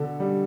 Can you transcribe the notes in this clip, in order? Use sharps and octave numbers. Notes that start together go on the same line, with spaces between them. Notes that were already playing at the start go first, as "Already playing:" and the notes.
Already playing: B2 D3 A4
G3